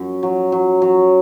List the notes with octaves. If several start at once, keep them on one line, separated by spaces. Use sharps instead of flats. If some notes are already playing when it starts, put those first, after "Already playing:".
Already playing: F#2
F#3
F#3
F#3